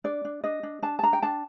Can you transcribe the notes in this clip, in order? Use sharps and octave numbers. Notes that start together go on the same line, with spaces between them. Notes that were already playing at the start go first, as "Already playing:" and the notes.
D4 D5
D4
D4 D#5
D4
D4 A5
A5
D4 A#5
G5
D4 A5